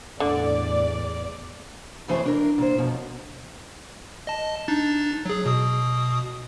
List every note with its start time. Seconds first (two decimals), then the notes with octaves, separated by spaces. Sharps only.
0.20 E2 A2 D3 D5
2.08 F2 E3 A3 C5 C#5
2.23 E3 D4 A#4
2.58 A#2 C5
2.78 F#2 B2 F3
4.27 D#5 A5
4.68 D4 D#4 A6
5.26 F#3 G#4
5.46 B2 D#6